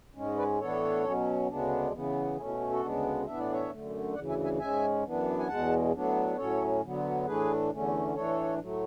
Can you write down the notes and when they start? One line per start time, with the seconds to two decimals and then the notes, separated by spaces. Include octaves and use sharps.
0.15 G#2 G#3 C#4
0.37 B4 D5
0.59 A2 E3 B3 D4 A4 C#5
1.04 B2 F#3 C#4
1.47 D2 C#3 G#3 B3 D4
1.92 C#3 E3 B3
2.36 B2 A3 C#4 E4 G#4
2.47 E4
2.59 F#4
2.70 F#4 A4
2.81 D2 C#3 G#3 B3 D4
3.25 A2 E3 B3 D4 E5
3.39 D5
3.52 C#5 E5
3.70 F#2 D3 A3
4.14 D2 C#3 E3 D5 F#5
4.29 E5 G#5
4.44 E5 G#5
4.59 G#2 G#3 C#4 E5 G#5
5.03 F#2 E3 B3 D4
5.39 G#5
5.48 E2 B2 G#3 F#5 A5
5.92 A2 F#3 B3 D4
6.36 A2 F#3 C#4 A4 C#5
6.81 D2 D3 F#3 B3
7.26 A2 E3 A3 D4 G#4 B4
7.70 E2 D3 A3 C#4
8.14 A2 E3 A3 D4 A4 C#5
8.58 A2 F#3 A3